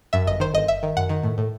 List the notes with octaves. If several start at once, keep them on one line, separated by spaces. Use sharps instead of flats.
F#2 E5
G1 D#5
D#3 C5
G1 D#5
G1 E5
D#3
F#2 F#5
D#3
A2
A2